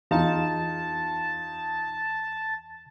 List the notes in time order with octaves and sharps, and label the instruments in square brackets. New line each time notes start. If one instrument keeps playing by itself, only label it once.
[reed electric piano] E2 [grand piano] D#4 F4 [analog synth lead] A5